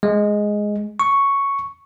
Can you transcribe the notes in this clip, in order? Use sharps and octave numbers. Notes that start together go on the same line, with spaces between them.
G#3
C#6